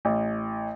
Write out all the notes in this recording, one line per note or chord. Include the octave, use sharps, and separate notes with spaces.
A1